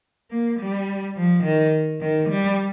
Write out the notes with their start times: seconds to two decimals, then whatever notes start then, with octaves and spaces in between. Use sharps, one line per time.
0.30 A#3
0.58 G3
1.16 F3
1.43 D#3
2.00 D#3
2.28 G3